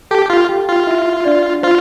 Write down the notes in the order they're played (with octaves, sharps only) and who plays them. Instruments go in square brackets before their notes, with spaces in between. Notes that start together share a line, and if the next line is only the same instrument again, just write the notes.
[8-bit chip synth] G4 [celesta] A4 A5
[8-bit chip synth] F4
[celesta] G4 G5
[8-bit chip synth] F4
[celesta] E4 E5
D4 D5
[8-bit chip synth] F4 [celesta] C5